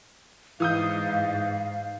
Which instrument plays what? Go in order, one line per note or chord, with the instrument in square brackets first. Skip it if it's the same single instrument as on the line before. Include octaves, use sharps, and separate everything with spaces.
[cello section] G#2 [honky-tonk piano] E3 D#6 G6 [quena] F5